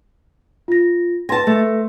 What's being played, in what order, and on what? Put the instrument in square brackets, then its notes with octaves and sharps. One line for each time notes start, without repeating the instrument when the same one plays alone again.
[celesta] F4 A#6
[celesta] B4 C6 A#6 [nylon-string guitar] G#5 A5
[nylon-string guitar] A3